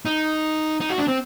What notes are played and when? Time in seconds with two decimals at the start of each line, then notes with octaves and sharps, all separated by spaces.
0.06 D#4
0.81 D#4
0.90 F#4
0.99 D4
1.08 C4